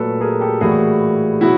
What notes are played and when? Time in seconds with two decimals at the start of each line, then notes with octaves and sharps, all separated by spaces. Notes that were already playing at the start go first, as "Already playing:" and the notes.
Already playing: A#2 F#3 A3 A4 B4
0.21 G#4 A#4
0.40 G4 A4
0.61 A2 E3 G3 A#3 F#4 G#4
1.41 B2 F#3 E4 F#4